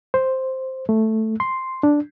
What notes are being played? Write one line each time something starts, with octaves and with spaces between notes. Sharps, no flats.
C5
A3
C6
D4